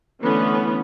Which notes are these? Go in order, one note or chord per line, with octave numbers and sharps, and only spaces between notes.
D3 E3 A3 B3 C#4